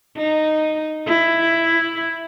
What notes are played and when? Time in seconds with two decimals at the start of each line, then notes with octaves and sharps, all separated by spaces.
0.17 D#4
1.07 E4